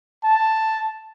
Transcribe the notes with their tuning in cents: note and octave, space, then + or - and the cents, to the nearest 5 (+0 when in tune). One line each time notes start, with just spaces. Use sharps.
A5 +5